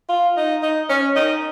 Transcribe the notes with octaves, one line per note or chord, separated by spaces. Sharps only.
F4
D#4
D#4
C#4
D#4